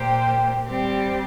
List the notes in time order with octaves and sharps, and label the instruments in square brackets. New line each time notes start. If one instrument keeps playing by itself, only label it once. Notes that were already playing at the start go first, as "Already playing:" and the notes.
Already playing: [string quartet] A#2 A#3 G4 C5 [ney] G5
[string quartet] G3 C4 G4